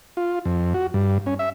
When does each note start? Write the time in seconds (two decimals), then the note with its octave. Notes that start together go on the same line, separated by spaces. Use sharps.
0.17 F4
0.45 F2
0.74 F#4
0.94 G2
1.26 C#4
1.39 E5